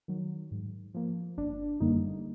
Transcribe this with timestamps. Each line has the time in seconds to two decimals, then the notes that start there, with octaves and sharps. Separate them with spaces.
0.08 D#3 F#3
0.51 G#2
0.94 F3 A#3
1.38 G1 D4
1.80 F#2 D3 G3 A#3 D#4